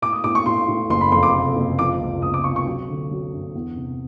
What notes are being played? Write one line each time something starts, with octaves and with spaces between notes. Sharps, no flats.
A2 D6
D#6
A2 D6
C#6
A2 C6
A2
F#1 C6
B5
F2 C6
D6
C3
F#1
F3 D6
C#2
C#2 D#6
D6
C3 C#6
C#6
F#3
D3
F#3
G2
E2
C3